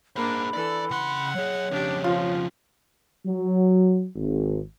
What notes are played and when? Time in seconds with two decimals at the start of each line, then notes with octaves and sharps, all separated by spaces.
0.16 A#3 D4 G#4 C5 B5
0.53 E3 A4 D5
0.91 C#3 F#5 C6
1.35 F#3 G#4 C#5
1.71 F2 C#3 D4 G4
2.04 F3 F4
3.26 F#3
4.16 G#1